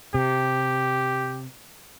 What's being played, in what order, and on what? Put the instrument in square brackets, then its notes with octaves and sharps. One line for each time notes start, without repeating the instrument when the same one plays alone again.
[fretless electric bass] C3 [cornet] G4